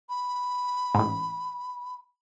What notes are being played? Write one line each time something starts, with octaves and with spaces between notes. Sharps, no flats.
B5
A1 G#2